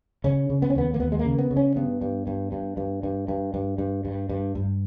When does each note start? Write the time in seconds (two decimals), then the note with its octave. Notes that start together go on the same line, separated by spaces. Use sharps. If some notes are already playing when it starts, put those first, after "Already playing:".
0.24 C#3 C#4
0.50 C#3
0.62 B3
0.70 C#4
0.75 D#2 B3
0.94 A#3
1.00 D#2 B3
1.12 G#3
1.19 A#3
1.25 C#3
1.38 B3
1.51 C#3
1.57 C#4
1.76 G2 B3
2.01 G2
2.27 G2
2.52 G2
2.77 G2
3.03 G2
3.28 G2
3.54 G2
3.78 G2
4.05 G2
4.29 G2
4.55 G2